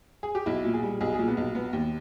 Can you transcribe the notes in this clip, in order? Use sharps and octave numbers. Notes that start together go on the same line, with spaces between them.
G#4
G4
B1 E4
A#2
G#4
G3
B1 G#4
A#2 G#4
B3
B1
B3
D#2